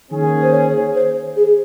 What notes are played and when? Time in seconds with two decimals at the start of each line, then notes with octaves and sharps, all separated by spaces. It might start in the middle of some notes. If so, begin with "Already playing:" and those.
0.11 D#3 A#3 C#4 G#4
0.42 C5
0.53 C#5
0.95 C5
1.36 G#4